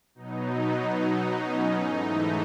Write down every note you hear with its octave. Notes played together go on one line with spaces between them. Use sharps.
B2 F#3 B3 D#4
D#4
C#4
G#2 E3 A3 D#4